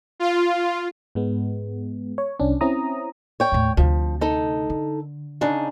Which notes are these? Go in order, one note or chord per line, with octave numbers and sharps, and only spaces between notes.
F4
G#2 G#3 B3
C#5
C2 C#4 D4
C4 C#4 E4 A#5 D#6
C#5 G5
D#2 A2
D2 C3 F3
D#4 A4
D3
C#3 D4 D#4